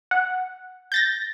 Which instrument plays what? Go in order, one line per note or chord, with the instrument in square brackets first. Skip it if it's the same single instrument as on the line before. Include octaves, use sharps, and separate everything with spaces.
[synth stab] F#5
[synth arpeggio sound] G6 A6 A#6